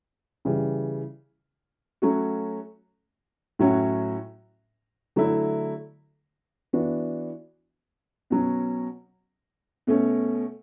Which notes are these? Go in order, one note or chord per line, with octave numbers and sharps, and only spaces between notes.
C#3 E3 G3
F#3 A3 C#4 F#4
A2 F#3 C#4 F#4
D3 F#3 A3 E4
E3 B3 D4 F#4
B2 F#3 C#4
B2 A3 C#4